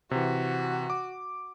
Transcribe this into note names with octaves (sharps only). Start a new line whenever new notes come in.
C3 E3 F#4
D6